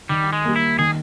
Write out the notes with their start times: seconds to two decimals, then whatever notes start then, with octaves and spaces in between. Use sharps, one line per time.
0.09 D#3 G3
0.33 G#3
0.45 G3 A#3
0.56 E4
0.79 D#3 G#4